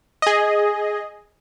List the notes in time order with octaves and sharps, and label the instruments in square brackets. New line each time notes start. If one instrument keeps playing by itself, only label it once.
[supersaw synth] G#4 D#5